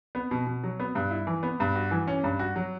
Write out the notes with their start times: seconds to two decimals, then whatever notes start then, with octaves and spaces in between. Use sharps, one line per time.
0.15 B3
0.31 B2
0.47 B2
0.64 F#3
0.80 B3
0.95 G2
1.11 E4
1.27 E3
1.43 B3
1.60 G2
1.75 F#4
1.91 E3
2.07 C#4
2.24 G2
2.39 F#4
2.56 F#3